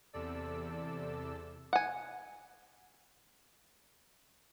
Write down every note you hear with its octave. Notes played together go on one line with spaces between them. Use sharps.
E2 C3 A4 D5 E6
F#5 G#5